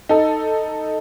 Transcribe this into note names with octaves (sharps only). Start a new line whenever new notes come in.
D#4 A4